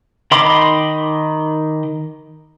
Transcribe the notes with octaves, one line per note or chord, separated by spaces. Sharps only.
D#3 D#5 B5 C6 D6